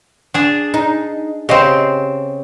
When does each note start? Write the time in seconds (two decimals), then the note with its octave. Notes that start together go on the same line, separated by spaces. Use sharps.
0.34 D4 G#4
0.74 D#4
1.49 C#3 C4 G4 D#5